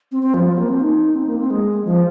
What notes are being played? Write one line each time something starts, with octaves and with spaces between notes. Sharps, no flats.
C4
C4
F3
F3
A#3
C4
D#4
C4
A#3
C4
G#3
F3